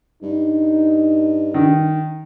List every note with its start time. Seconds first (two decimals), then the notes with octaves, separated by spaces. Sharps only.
0.22 G2 D#4
1.54 D#3